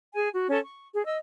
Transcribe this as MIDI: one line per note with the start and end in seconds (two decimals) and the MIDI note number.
0.14 0.29 68
0.14 0.29 80
0.34 0.47 66
0.50 0.59 61
0.50 0.59 69
0.50 0.59 85
0.64 0.88 85
0.93 1.05 68
1.05 1.17 75
1.05 1.17 88